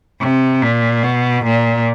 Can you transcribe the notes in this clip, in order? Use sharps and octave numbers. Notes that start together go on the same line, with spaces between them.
C3
A#2
B2
A#2